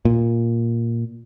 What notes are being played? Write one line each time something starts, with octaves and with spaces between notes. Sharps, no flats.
A#2